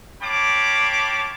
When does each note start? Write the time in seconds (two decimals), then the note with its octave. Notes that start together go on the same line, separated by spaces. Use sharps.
0.22 C#5 F5 G5 A5 B5 D6